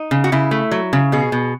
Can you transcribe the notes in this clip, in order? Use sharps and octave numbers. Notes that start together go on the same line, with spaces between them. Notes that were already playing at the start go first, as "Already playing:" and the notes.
Already playing: D#4
C#3
F#4
C#3 E4
A3
F#3
C#3
B2 G#4
B2